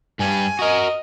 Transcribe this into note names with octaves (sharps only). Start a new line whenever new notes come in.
G2 G3 G#5
F#4 A#4 D#5